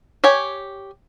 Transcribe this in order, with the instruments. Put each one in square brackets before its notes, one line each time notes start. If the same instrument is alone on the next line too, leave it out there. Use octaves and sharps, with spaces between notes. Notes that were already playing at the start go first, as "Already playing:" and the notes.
[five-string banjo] G4 C#5 G#5